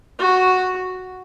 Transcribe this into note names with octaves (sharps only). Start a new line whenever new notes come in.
F#4